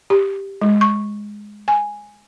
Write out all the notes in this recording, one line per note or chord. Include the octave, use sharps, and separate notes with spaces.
G4
G#3
C#6
G#5